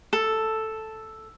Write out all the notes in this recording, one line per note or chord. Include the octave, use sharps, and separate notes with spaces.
A4